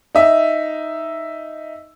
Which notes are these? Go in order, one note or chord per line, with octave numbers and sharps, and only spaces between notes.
D#4 E5